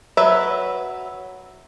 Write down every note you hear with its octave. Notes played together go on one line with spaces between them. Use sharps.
F#3 B4 E5